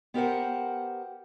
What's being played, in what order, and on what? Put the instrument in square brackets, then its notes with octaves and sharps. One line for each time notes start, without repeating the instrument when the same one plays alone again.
[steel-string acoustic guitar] B3 G4 A#4 C5 F#5